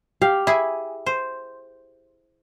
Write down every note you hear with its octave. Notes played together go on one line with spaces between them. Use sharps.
G4 F5
E4 G#4
C5